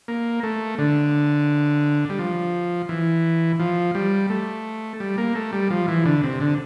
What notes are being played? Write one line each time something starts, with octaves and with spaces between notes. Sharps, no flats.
A#3
A3
D3
G3
F3
E3
F3
G3
A3
G3
A#3
A3
G3
F3
E3
D3
C3
D3